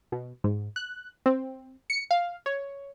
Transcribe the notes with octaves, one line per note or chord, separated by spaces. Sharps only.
B2
G#2
F#6
C4
C#7
F5
C#5